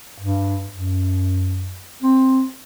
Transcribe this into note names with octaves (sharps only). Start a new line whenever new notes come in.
G2
F#2
C4